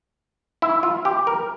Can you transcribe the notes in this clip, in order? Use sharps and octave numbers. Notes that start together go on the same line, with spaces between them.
E4
F4
G4
A#4